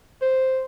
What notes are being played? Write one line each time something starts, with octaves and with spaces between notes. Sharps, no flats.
C5